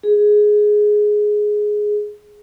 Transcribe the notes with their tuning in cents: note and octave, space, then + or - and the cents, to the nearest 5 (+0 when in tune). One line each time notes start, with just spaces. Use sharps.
G#4 +10